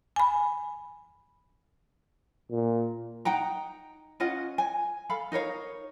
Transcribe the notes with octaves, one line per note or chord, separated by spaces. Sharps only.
G#5 B5
A#2
D#4 F#5 G5 A#5
C#4 F4 D#5 F#5
G#5
A4 F5 B5
D#4 A#4 C#5 F5